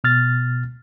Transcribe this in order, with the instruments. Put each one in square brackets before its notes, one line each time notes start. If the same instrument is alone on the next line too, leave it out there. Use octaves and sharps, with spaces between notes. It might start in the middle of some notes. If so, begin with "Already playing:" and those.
[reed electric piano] B2 F6 A6